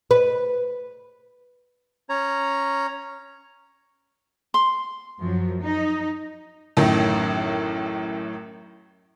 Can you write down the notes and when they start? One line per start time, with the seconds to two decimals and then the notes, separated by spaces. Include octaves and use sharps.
0.11 B4
2.09 C#4 C#5 A#5
4.54 C6
5.20 F#2 F3 F#3
5.61 D#4
6.77 A1 F#2 A2 D#3